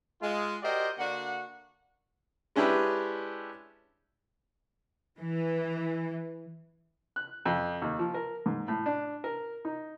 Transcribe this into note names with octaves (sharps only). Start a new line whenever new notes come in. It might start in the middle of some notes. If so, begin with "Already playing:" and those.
G#3 F4
F#4 G4 A#4 C5 D5 D#5
D3 A#3 D4 F#4 F#5
G#3 C#4 D4 E4 G4 B4
E3
F#6
F2
D#2
F3
A#4
G#2
A2
D4
A#4
D#4